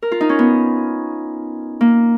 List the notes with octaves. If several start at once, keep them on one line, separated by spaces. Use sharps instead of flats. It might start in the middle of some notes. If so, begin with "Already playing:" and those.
A#4
F4
D#4
C#4
B3
A#3